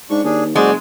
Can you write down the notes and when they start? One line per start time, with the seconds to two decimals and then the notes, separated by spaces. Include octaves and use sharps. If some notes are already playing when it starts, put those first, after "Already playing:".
0.10 G#2 D4 C#6
0.24 D#2 D4 G#4
0.56 F#1 G#3 F#4 C5 D5